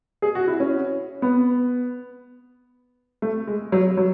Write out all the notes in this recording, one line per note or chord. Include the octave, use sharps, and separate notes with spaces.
G#4
F#4
E4
C#4
B3
A3
G#3
F#3
F#3